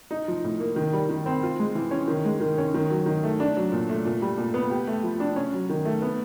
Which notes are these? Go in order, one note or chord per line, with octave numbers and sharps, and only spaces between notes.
D#4
F3
A2
A#3
D#3
G3
D#3
C4
F4
G#3
E3
C#4
D#3
G#3
D#3
C#4
D#3
F#3
D#3
A3
D4
F#3
A#2
A3
A#2
G3
A#2
B3
G4
A3
F3
D4
C#4
F#3
D#3
A3
B3